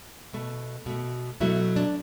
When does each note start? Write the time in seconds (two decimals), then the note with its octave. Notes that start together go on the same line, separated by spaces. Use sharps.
0.33 B2 A3
0.86 B2 A3
1.40 B2 F#3 A3 E4
1.76 D4